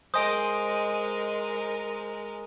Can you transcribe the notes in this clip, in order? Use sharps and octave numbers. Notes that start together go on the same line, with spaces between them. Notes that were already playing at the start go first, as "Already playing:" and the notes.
G#3 A#4 C5 D#5 G#5 D#6 D7